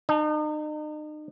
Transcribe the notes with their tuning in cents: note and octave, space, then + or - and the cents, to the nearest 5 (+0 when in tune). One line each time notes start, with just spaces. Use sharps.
D#4 -40 A5 +0